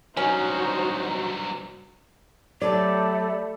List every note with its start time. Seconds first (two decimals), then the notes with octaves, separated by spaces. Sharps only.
0.17 G2 F#3 C#4 D#4 F#4 C5 A#5
2.62 F#3 A3 G4 A4 D5 B5